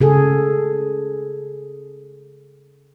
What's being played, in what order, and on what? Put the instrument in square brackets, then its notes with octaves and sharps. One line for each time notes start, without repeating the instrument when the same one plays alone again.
[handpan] C#3 G#4 A4